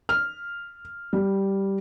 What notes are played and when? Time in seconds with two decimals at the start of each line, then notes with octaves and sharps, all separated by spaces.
0.09 F6
1.13 G3